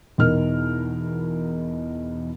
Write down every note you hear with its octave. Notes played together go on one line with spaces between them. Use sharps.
E2 B2 D#4 A#4 F6